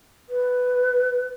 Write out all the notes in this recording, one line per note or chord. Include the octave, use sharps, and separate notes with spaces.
B4